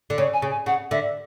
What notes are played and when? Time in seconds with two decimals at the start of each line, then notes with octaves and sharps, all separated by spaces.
0.10 D3
0.18 C#3 C#5
0.33 G#5
0.42 C#3
0.50 G#5
0.66 C#3 F#5
0.91 D3 E5